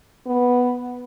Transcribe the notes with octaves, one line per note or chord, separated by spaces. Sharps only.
B3